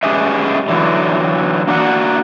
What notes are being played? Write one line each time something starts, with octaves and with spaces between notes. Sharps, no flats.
G#3 C#4 G4 G#4 B4 E5
D3 E3 F#3
A#3 D4 F#4 F#5